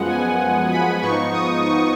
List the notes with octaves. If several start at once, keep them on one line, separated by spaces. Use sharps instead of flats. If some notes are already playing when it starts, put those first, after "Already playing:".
Already playing: F#2 F3 G#3 B3 F#5
G#5
B5
G#2 F3 B3 D#4 C#6
D#6
C#6